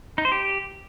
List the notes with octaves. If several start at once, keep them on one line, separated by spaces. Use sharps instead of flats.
D#4
C5
G4